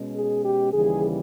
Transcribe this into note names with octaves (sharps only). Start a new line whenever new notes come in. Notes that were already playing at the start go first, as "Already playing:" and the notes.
Already playing: B2 G#3 C#4
G#4
G4
D#2 C#3 E3 G3 G#4